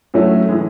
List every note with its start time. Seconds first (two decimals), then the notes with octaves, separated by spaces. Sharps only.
0.14 A2 F#3 A3 C#4
0.49 A2 E3 G#3